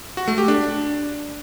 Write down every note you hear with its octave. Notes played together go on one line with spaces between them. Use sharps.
F#4
A3
G4
D4